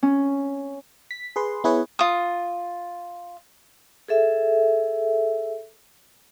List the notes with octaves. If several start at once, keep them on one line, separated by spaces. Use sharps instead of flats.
C#4
B6
G#4 B4 C6
B3 E4 G#4 B4 C#5
F4 D#6
G#4 A4 E5